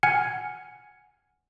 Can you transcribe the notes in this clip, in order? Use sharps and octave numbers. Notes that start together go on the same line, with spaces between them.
F#5 G#5 F6 G#6 C#7